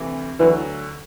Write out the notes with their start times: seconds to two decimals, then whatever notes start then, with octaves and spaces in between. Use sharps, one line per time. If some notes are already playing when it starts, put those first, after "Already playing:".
Already playing: D2 C3 E3 A3
0.39 D2 D3 E3 F#3